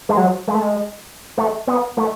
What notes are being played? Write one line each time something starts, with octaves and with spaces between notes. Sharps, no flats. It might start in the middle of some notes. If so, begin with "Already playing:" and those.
G#3
F#3
G#3
A3
G#3
A3
B3
A3